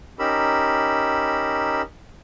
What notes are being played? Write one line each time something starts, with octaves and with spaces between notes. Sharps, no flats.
C#4 D#4 G4 A#4 B5 E6